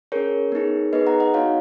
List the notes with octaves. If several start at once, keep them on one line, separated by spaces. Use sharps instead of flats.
C#4 G#4 A#4 C#5
B3 D#4 G#4
B3 D#4 G#4 B4 D#5
F#5 A#5
D#5 F#5
B3 D#4 F#4 C#5 F5